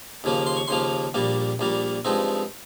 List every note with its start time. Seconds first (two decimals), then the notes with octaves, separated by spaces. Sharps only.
0.24 D#2 C#3 F3 A#3
0.46 C6
0.57 C#6
0.68 D#2 C#3 F3 A#3 C6
1.14 A#1 A#2 G3 A#3
1.59 A#1 A#2 G3 A#3
2.05 G2 F3 G#3 C4 D#4